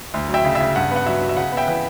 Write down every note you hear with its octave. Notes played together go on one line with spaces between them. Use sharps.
D2
F#3
E5 G5
C#3
E5
C#3
G2 F#5
B3
F#5
F#3 E5
F#3
E5
C#3 F#5
B3
E5 G5
E3